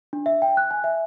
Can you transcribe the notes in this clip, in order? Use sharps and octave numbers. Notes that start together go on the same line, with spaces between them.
D4
E5
G5
F#6
G#5
E5